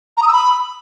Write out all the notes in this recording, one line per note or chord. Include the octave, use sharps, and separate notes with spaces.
A#5
D#6
E6
B5